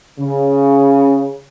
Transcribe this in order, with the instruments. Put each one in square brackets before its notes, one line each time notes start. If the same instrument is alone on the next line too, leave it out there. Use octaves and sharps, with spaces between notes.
[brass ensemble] C#3